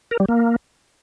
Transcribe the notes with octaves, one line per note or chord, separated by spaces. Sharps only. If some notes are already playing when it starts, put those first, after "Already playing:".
A#4
G3
A#3